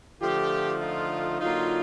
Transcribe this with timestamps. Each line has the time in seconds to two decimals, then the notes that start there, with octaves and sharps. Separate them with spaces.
0.21 D3 F3 A3 F4 G4
0.81 D#4 F4
1.41 D3 F#3 A#3 D#4 F4